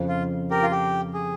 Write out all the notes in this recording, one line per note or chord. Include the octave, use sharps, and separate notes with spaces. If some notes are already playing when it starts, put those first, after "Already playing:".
Already playing: F2 C#3 F3
F4
G4 A#4
F4
G4
G#4